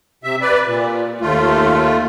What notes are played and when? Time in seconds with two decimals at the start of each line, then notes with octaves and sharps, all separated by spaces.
0.24 C3 E5
0.41 B4 D5
0.66 A#2
1.21 D#2 A3 F4